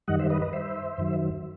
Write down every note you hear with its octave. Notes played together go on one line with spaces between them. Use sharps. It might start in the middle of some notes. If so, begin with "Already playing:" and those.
F#2 D#3 G3 D#5 F#5
C5 E5
B4 D#5
B4 D#5
C5 E5
F#2 D#3 F#3